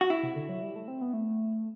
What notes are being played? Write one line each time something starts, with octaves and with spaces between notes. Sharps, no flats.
F#4
E4
C3
D3
F#3
G3
A3
C4
B3
A3